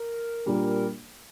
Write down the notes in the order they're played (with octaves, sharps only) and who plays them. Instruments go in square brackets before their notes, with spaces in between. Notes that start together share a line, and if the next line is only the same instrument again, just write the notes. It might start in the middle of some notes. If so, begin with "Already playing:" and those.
Already playing: [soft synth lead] A#4
[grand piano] A#2 G3 A#3 D4